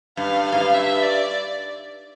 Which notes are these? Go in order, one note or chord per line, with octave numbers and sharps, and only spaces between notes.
G2 F5
F5
G#2
G2
E5
D5